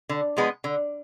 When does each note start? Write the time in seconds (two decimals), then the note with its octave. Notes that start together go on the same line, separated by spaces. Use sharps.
0.09 D3
0.37 F3 G#3 B3
0.64 D3